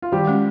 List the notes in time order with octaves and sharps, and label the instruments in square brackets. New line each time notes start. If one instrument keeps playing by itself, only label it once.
[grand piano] F4
[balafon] D#3 [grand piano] G3 G4
[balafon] G#3 C#4